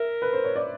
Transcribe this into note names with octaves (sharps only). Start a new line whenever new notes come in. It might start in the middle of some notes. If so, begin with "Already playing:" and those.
Already playing: A#4 E5
B4
C5
C#5
D5